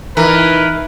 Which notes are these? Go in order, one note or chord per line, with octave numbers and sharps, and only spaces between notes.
E3 D#4 A#4 B4